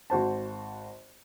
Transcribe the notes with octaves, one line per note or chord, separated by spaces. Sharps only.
G#1 F#4 C5 A5